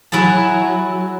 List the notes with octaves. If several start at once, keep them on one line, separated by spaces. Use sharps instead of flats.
F#3 E4 G#4 A5